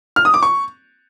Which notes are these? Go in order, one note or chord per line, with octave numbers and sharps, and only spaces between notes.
F6
D#6
D6
C#6